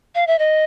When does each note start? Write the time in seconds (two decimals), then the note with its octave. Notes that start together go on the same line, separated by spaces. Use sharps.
0.15 F5
0.27 E5
0.39 D#5